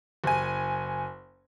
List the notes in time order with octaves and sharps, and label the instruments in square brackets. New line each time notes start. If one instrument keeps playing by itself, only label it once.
[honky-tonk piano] F#1 G#5